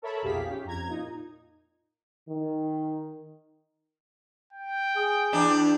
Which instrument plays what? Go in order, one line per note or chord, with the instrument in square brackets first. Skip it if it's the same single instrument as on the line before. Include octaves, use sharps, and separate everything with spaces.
[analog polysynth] A4 A#4 C#5 E5 A5 B5
B1 F2 G4 G#4 F5 B6
C#4 G4
F2 A#5 G#6
A#2 D#4
[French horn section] D#3
[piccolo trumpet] G5
[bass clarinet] G#4
[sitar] E2 D4